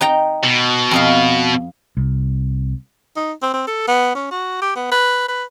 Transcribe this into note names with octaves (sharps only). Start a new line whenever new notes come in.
D#4 G5 A#5
B2
F2 D#5 F5
C2
D#4
C4
C4
A4
B3
C#4
F#4
G4
B3
B4
B4